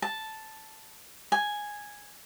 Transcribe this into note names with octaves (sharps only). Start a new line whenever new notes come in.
A5
G#5